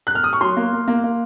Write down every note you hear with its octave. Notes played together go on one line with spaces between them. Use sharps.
F#6
F6
D#6
C#6
F#3 C6
A#3
A#3
A#3
A#3